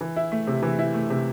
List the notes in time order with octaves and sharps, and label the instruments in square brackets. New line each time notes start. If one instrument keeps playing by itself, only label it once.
[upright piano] E3
E4
A3
C3
E3
E4
A3
C3